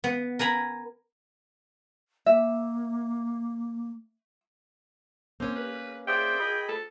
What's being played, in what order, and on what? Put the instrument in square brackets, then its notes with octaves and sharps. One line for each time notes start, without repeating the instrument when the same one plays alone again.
[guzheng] B3
A#4 G#5 A#5 B5
[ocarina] A#3 [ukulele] E5
[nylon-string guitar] A#3 C#4 [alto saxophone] C4
[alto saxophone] B4
[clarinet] G#4 [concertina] C5 D5 E5 [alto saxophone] G5
[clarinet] G#4 [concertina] D#5 B5
[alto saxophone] A4